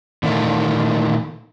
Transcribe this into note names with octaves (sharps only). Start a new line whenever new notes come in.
A#2 D#3 E3 A3 A#3